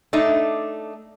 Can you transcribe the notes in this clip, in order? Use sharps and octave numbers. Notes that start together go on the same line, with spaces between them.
A3 D4 D#4